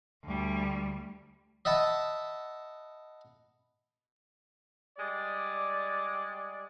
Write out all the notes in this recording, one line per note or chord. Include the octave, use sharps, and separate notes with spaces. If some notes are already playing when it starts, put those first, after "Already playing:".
D2 G3
D#5 E5 F#5 A5 B5
G3 G#3 D5